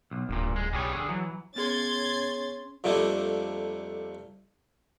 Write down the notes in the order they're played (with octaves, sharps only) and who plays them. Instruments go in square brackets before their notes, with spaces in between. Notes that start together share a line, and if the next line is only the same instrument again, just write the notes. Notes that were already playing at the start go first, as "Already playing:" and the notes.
[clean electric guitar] B1
[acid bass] D1 [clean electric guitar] G2 A#2
[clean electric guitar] G#3
[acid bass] B1 [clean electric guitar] G3 G#4 C#5
[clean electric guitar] D3 G#4
[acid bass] E3 [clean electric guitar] F#3
[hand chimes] B3 G#4 C#5 [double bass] C#4 [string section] C6 G#6 A6
[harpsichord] F2 A#2 G3 A3 A#3 D4